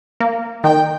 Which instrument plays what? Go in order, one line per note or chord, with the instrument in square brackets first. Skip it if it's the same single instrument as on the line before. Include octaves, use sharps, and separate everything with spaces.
[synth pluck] A#3
[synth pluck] D#3 [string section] G5